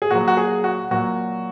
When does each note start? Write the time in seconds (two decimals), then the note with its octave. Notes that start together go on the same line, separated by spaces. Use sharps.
0.02 G#4
0.11 A#2 F#3 F#4
0.28 F#4
0.37 G#4
0.64 F#4
0.91 A#2 F#3 F#4